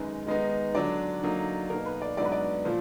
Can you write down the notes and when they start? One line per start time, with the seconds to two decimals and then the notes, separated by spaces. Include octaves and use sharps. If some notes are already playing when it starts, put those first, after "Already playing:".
Already playing: F#2 D#3 G#3 D#4 B4
0.27 D#3 G#3 B3 D#4
0.75 D3 F#3 D4 D5
1.22 D3 F#3 A#3 D#4
1.70 B2 A#3 D#4 A#4
1.86 B4
2.02 D5
2.17 G#2 F#3 B3 D4 D5
2.25 B4
2.32 D5
2.65 A#2 F3